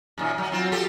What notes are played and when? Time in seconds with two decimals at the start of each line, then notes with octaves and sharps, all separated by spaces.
0.18 F#2 A#2 D#3
0.38 F#3
0.52 F#3 C4 F4
0.72 F4 G4 A4